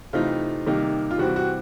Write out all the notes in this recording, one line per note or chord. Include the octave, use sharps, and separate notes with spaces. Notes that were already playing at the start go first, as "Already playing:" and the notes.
C3 E3 A3 C4 D#4 F4
C3 D#3 G3 A#3 D#4
F4
C3 E3 G3 C4 F#4
F#4